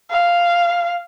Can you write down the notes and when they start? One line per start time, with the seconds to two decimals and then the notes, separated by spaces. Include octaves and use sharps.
0.10 F5